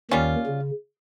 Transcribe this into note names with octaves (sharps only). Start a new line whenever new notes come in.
D#2 D#3 G3 C#4 F4
C#3